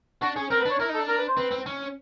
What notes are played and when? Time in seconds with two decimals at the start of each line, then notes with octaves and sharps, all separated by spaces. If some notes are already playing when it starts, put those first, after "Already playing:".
0.22 D4 F#4
0.36 C#4 G#4
0.50 C4 A#4
0.61 B4
0.66 D4 C#5
0.79 E4 A#4
0.89 D#4
0.94 A4
0.99 D4
1.08 A#4
1.18 B4
1.28 C5
1.37 C4 B4
1.51 C4
1.66 C#4